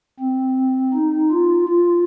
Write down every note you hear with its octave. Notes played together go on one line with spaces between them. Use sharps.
C4
D#4
F4
F4